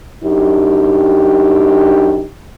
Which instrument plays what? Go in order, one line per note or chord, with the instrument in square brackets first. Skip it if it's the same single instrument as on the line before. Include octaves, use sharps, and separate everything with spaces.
[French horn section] F#2 D4 D#4 G4